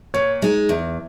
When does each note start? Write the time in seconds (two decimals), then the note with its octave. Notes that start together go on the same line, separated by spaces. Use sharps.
0.14 A#2 C#5
0.42 G#3 D#4
0.69 E2